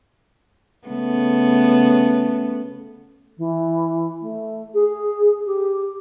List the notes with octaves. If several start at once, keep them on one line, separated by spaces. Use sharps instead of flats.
C#3 A3 B3
E3
A3
G#4
G4